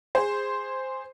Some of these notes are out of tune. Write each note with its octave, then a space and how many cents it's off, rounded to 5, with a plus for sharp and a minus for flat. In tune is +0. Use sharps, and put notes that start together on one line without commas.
G#4 -15 C5 +0